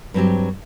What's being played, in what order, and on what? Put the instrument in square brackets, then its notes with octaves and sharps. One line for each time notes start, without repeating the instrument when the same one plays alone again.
[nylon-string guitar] G2 F#3 C4 G4